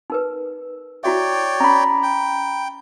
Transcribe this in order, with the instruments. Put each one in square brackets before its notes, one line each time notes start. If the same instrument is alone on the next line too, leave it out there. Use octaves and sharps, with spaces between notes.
[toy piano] D#4 A#4 B4
[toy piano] E4 F#4 E5 [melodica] C#5 D5 G5
[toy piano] C#4 [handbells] A#5 B5
[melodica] G5